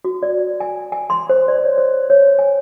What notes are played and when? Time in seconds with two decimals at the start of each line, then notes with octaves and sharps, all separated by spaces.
0.05 F#4
0.23 D5
0.60 G#5
0.92 G#5
1.10 C6
1.30 C5
1.48 D5
1.64 C#5
1.78 C5
2.10 C#5
2.39 G#5